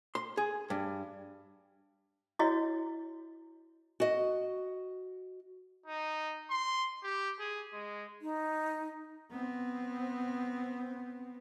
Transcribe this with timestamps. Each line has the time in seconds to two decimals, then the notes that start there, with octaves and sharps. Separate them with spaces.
0.15 C6
0.37 G#4
0.70 G2
2.39 E4 F#4 C#5 D#5
4.00 F#4 D#5
5.86 D#4
6.50 C6
7.03 G4
7.39 G#4
7.73 G#3
8.21 D#4
9.31 B3 C4